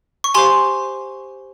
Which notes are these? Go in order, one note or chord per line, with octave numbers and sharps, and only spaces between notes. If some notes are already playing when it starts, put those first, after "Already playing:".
C#6
G4 C5 F5 G#5 C6